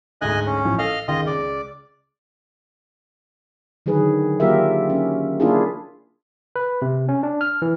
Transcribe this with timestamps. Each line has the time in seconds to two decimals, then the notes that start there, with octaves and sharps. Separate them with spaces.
0.22 D2 G#2 D3 D#5 G#5 F#6
0.46 C#4
0.65 A1 F3
0.78 A4 D#5 F5 F6
1.08 C#2 D#3 F4 D#5
1.27 C#2 D5
3.86 D3 D#3 F#3 G#4 B4
4.40 F#3 A#3 F4 G4 A#4 E5
4.90 C#4
5.40 A#3 D4 E4 F4 G#4
6.56 B4
6.82 C3
7.09 C#4
7.23 D4
7.41 F6
7.62 E3